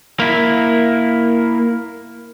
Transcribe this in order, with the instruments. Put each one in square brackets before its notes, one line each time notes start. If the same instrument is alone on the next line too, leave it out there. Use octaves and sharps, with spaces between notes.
[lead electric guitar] A#3 E4